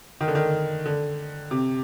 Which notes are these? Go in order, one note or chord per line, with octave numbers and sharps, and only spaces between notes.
D#3
D3
D#3
D3
C3